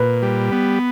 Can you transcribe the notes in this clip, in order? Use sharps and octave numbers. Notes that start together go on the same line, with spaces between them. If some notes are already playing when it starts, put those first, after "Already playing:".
Already playing: A#2 B4
G3
B3